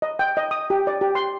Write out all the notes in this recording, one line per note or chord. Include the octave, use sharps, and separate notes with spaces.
D#5
G5
D#5
D#6
G4
D5
G4
C6